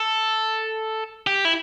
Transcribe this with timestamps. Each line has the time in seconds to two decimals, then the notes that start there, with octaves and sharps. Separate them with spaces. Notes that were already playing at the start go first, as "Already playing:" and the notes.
Already playing: A4
1.27 G4
1.45 E4